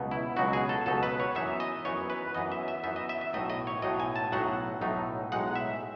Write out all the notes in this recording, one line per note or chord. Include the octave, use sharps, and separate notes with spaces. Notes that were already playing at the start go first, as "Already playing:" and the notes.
Already playing: C#2 B2 F#3 B3 D#4
E4
C#2 B2 F#3 B3 D#4 F#4
G#4
A4
C#2 B2 F#3 B3 D#4 A4
B4
C#5
F#2 E3 B3 D#4 E5
D#5
F#2 E3 B3 D#4 C#5
B4
F#2 E3 B3 D#4 D#5
E5
E5
F#2 E3 B3 D#4 E5
D#5
E5
E5
B1 A2 F#3 A3 D#4 D#5
D#5
C#5
B1 A2 F#3 A3 D#4 D#5
G#5
A5
B1 A2 F#3 A3 D#4 F#5
B1 A2 F#3 A3 D#4
B1 A2 G#3 D#4 F#5
E5